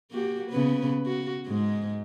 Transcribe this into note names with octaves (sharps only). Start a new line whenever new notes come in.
A#3 F#4 G4
C#3 B3 B4
F#4
G#2 G#3